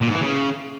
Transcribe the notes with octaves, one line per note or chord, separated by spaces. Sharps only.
A#2
G#2
E3
C#3